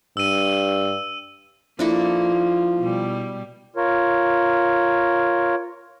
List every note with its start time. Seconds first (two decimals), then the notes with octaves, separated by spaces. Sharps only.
0.17 G2 E6 D#7
1.79 F3 A#3 D4 E4 A4
2.79 B2 G3
3.76 F4 A#4 C#5